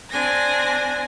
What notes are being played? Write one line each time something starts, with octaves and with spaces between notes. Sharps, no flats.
C4 D4 G#5 A#6